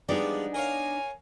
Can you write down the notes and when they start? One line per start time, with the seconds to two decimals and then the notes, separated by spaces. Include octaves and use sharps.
0.09 F3 G3 G#3 B3 D4 D#4 D5
0.54 A#4 C#5 F5 G#5